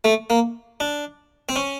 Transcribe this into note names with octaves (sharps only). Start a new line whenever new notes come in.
A3
A#3
D4
C4
C#4